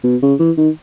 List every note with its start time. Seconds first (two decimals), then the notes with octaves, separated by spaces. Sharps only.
0.04 B2
0.22 C#3
0.39 E3
0.57 D#3